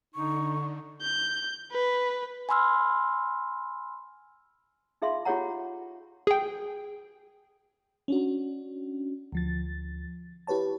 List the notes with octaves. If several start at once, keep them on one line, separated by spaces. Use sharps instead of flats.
D3 D#4 C#6
G6
B4
G#5 B5 C6 E6 F6
D#4 F4 G#4 E5 F5 C6
F4 G4 G#4 C#5 F#5 A#5
G#4 G5
C#4 D4 F#4
D2 F3 A6
E4 G4 B4 C#5 A5